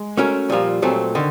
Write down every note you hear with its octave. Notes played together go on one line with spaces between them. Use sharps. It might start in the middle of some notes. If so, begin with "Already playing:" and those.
Already playing: G#3
A3 C#4 F#4 A#4
A#2 F3 G3 A#3
A#2 F#3 A3 C4
D3 D#3